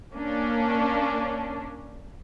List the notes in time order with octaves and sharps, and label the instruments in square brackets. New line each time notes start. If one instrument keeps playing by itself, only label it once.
[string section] A#3 C#4 D4